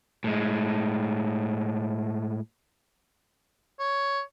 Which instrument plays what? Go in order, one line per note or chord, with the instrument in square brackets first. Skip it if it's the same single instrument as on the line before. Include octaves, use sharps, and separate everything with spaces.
[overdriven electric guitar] A2 G#3
[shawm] C#5